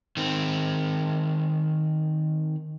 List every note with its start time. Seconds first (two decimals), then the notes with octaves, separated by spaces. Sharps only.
0.17 D#3 C4